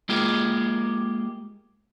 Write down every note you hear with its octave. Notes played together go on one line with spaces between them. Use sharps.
G#3 A#3 F4 G4 G#4 A#4